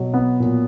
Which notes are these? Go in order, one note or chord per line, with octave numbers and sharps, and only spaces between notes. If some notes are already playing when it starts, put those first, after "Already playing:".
Already playing: B2 F#3
B3 B4
A#2 F#3